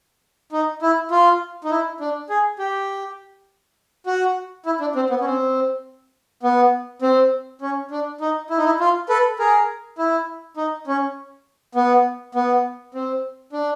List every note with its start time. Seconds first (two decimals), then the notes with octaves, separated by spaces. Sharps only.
0.52 D#4
0.82 E4
1.11 F4
1.64 D#4
1.71 E4
2.01 D4
2.30 G#4
2.59 G4
4.06 F#4
4.66 E4
4.81 D4
4.96 C4
5.10 B3
5.21 C#4
5.25 C4
6.43 B3
7.02 C4
7.62 C#4
7.91 D4
8.21 D#4
8.50 E4
8.58 D#4
8.65 E4
8.80 F4
9.09 A4 B4
9.39 G#4 A#4
9.98 E4
10.57 D#4
10.87 C#4
11.75 B3
12.35 B3
12.94 C4
13.53 D4